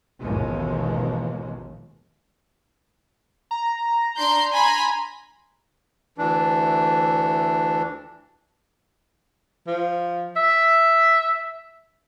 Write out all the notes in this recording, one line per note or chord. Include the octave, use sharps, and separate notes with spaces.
A1 D#2 B2 E3 F3 G#3
A#5
D4 C6 G6
G#5 B5 C6
D2 E3 D4
F3
E5